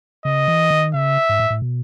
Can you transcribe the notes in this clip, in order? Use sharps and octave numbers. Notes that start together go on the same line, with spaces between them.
C#3 D#5
E3
D#3
C#3 E5
G#2
A2
A2
B2